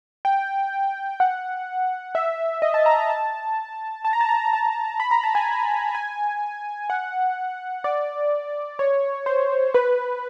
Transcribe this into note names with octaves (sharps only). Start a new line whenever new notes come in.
G5
F#5
E5
D#5
A5
A#5
A#5
A5
A5
A#5
A5
A#5
A5
A#5
A5
B5
A#5
A5
G#5
G#5
F#5
D5
C#5
C5
B4